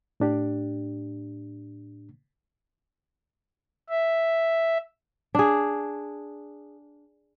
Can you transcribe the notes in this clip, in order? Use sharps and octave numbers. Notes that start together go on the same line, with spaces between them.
A2 D4 G4
E5
D4 G#4